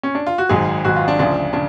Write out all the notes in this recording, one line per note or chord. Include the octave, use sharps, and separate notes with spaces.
C#4
D4
F4
F#4
G#1 G#2 F#3 G#4
G#1 G#2 F#3 F#4
F4
D4
D2 C#3 F3 D4
C#3 D4